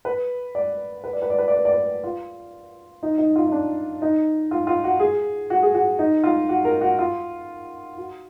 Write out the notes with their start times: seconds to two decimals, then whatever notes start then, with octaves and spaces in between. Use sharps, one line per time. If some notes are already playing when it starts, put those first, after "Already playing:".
0.05 B4
0.55 D5
1.04 B4
1.13 D5
1.22 B4
1.30 D5
1.38 B4
1.48 D5
1.56 B4
1.65 D5
1.73 B4
2.04 F4
3.03 D#4
3.18 D#4
3.36 F4
3.46 D#4
3.52 D4
4.02 D#4
4.51 F4
4.67 F4
4.84 F#4
5.00 G#4
5.50 F#4
5.63 G#4
5.75 F#4
5.99 D#4
6.24 F4
6.49 F#4
6.65 A#4
6.81 F#4
6.99 F4
7.97 F#4